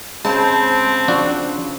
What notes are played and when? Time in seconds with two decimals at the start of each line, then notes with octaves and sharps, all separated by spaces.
0.25 C#3 G#3 C4 C5 A5
1.08 F3 D4 F#4